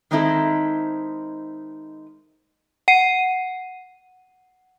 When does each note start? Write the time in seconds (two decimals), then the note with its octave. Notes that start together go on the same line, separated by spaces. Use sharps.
0.11 D#3 G#3 C4 D#4 E4 A4
2.88 F#5 C7 D#7